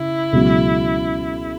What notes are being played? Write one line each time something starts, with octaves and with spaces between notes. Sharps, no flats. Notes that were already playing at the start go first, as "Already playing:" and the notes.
Already playing: C#3 E4
C#2 B2 F#3